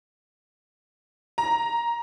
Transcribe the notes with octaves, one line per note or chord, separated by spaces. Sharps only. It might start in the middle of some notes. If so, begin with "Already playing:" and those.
A#5